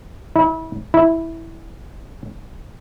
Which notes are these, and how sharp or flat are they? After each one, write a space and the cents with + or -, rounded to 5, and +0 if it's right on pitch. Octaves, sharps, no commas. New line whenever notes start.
E4 -30
E4 -5